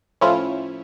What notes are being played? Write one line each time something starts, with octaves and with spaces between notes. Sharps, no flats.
A2 F3 C#4 E4 F4